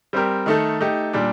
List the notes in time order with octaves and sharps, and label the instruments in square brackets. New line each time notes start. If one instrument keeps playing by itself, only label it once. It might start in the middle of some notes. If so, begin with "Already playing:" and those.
[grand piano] G3 C4 G4 A#4
D#3 A3 D#4 A4
A3 D#4 G4
A#2 G3 D4